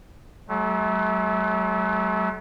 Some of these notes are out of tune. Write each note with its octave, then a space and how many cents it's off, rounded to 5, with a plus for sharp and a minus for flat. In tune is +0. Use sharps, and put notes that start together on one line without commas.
F#3 +35 A3 -35